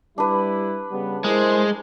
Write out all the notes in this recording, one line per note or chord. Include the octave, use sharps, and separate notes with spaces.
G3 D4 E4 B4
C#3 G3 B3
G#3 E4 A#4 C5